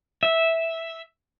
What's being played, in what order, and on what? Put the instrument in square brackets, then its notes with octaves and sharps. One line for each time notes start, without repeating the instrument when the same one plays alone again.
[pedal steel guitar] E5